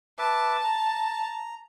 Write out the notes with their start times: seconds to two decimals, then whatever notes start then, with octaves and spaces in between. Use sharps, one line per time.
0.19 B4 E5 A5 D6
0.64 A#5